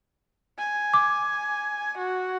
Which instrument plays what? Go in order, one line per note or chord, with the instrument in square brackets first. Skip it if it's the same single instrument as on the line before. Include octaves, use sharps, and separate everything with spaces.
[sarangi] G#5
[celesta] D6
[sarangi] F#4